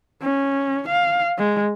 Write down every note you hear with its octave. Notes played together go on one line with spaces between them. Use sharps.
C#4
F5
G#3